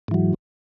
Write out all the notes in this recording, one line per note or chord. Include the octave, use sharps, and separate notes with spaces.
G#2 E3 F#3